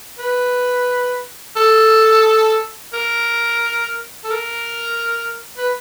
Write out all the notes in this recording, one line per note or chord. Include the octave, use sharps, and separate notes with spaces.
B4
A4
A#4
A4
A#4
B4